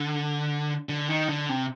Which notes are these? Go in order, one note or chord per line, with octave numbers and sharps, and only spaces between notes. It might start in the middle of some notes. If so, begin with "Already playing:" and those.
Already playing: D3
D3
D#3
D3
C3